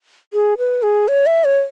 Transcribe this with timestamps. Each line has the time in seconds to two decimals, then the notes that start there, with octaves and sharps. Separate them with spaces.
0.33 G#4
0.58 B4
0.83 G#4
1.08 C#5
1.26 E5
1.44 C#5